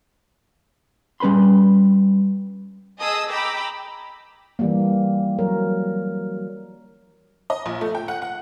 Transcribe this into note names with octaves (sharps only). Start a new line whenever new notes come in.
G3 C#4 B4 B5 C6
G#4 D#5 A5 D#6 E6
G5 A#5 B5 D6 E6
E3 G3 A#3
F#3 A#4 C#5
D#5
A#1
A3
G5
F#5
F#5